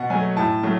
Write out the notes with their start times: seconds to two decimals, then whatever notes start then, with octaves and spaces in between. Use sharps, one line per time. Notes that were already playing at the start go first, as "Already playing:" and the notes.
Already playing: B2 F#5
0.10 F#3 A3 G#5
0.36 A2 A5
0.63 F#3 A3